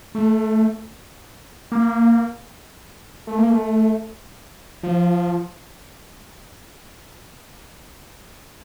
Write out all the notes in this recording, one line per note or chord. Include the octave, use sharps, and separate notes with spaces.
A3
A#3
A3
A#3
A3
F3